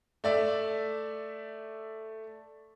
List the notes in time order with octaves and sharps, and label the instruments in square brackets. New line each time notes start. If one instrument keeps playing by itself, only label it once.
[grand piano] A3 D5 E5